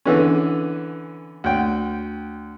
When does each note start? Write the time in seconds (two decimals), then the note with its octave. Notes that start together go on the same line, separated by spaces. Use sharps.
0.06 D3 E3 B3 C#4
1.44 D2 G5